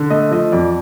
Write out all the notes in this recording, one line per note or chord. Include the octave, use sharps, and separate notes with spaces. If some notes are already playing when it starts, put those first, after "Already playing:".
Already playing: D3
A3 D#5
F3 D#5
F2 D5